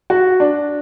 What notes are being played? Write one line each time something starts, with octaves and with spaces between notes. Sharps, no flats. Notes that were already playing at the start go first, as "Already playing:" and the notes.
F#4
D4